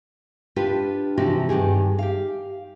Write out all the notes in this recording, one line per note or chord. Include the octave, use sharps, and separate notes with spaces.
D4 F4 G4 B4
C3 E3 F3 D#4 F#4 G4
G2 D#3 G4 G#4
G4 F5